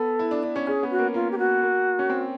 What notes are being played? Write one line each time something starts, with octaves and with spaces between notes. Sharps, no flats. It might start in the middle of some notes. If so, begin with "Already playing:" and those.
Already playing: B3 A4
E4
D4
D4
C#4
C#4 G#4
B3
F#4
A#3
A#3 F4
G4
F#4
A#3
C#4
C4